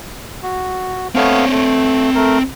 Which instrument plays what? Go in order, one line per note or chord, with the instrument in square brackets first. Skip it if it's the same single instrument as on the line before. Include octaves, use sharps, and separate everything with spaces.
[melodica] F#4
[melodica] A3 B3 F5 [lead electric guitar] C4 C#5
[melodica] A3
A3 A#4